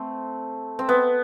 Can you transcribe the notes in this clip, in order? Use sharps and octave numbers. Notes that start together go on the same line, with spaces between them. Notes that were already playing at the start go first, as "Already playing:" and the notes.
Already playing: A3 C4
C4
B3